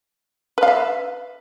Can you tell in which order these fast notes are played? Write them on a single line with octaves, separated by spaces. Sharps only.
B4 F5 E5